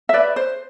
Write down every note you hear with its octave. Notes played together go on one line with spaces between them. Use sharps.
E5
B4 D5
C5